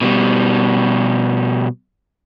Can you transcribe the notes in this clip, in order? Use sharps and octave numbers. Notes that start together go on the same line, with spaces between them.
B2 G3